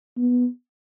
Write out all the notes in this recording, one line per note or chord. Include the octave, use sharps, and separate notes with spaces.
B3